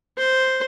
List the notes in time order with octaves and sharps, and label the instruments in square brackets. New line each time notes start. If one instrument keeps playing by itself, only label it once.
[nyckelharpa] C5